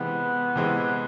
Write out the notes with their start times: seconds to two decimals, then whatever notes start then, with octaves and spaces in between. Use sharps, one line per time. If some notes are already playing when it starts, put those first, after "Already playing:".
Already playing: C3 E3 G#3 B3
0.56 C3 E3 G#3